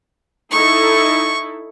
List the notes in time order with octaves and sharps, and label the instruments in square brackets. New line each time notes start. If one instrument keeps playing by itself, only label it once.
[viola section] D#4 E4 A4 [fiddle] C#6